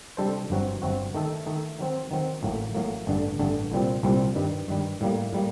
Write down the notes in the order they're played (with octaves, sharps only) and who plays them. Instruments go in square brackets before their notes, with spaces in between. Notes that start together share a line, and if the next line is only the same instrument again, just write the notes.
[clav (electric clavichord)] C3 G3 D4 A4 C5
G1 G2 F#3 C4 F#4
G1 G2 F#3 C4 F#4
D#3 A3 D#4 A4
D#3 A3 D#4 A4
D#3 F#3 C4
D#3 F#3 C4
A1 A2 F#3 A#3
A1 A2 F#3 A#3
A1 G2 D3
A1 G2 D3
C2 A#2 G3 C4
C2 A#2 G3 C4
G2 D#3 G3
G2 D#3 G3
A2 G3 A#3
A2 G3 A#3